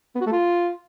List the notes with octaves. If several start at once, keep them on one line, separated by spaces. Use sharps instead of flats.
B3
F#4
A3
F4